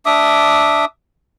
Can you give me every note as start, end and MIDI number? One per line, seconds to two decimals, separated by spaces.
0.06 0.85 62
0.06 0.85 76
0.06 0.85 86
0.06 0.85 87